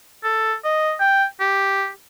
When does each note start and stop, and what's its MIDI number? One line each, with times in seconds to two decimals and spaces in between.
0.24 0.54 69
0.64 0.94 75
1.00 1.25 79
1.40 1.89 67